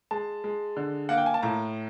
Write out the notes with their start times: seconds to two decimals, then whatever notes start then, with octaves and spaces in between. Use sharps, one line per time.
0.11 G#3 A5
0.44 G#3
0.77 D3
1.09 A#3 F#5
1.18 G5
1.26 G#5
1.34 A5
1.42 A2 A#5